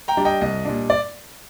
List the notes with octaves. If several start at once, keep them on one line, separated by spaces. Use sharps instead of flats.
G5 A#5
G3 D4
D#5 G5
C2 D#5
A#2 G3 D4
D5